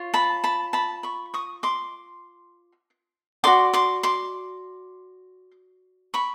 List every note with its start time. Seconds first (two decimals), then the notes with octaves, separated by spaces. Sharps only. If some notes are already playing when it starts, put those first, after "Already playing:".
Already playing: F4 C#5
0.14 A5 B5
0.44 A5 B5
0.73 A5 B5
1.03 B5 C#6
1.34 C#6 D#6
1.63 C6 D6
3.44 F#4 A4 D5 C6 D6
3.73 C6 D6
4.03 C6 D6
6.14 B5 C#6